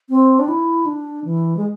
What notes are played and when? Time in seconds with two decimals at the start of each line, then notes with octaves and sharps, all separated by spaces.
0.10 C4
0.39 D4
0.48 E4
0.86 D4
1.25 E3
1.57 G#3